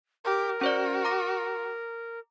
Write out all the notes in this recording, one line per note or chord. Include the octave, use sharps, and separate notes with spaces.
G4 A#4
C#4 F#4 C5 D5
A#5 D6 A#6